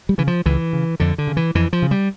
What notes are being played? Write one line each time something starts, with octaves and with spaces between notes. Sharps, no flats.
G3
C#3 E3
F3
C#2 E3
C#3
F2 D3
D3
C#3
E3
F2 E3
F3
C#3
G3